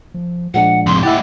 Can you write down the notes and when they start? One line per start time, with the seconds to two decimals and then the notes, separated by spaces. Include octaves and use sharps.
0.14 F3
0.54 A#2 F3 G#3 D4 F#5
0.86 F2 G#2 C3 C6
1.03 G#3 E4 G4 E5 F#5 A6